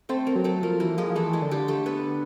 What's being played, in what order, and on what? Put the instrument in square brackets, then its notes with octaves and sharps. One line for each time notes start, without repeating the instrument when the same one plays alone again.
[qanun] A3 A4 [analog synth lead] C4
[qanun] A#3 A#4
[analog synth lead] F#3
[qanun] A3 A4
[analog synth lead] F3 [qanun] A#3 A#4
[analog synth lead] E3 [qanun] A#3 A#4
[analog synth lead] F3 [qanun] G#3 G#4
[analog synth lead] F3
[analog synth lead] E3 [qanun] A3 A4
[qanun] G#3 G#4
[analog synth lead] D3
[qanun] G3 G4
A3 A4
B3 B4